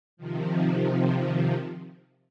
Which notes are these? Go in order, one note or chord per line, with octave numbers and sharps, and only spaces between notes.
C3 D#3 F3